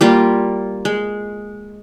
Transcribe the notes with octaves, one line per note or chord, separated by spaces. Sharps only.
G3 A#3 F4
G#3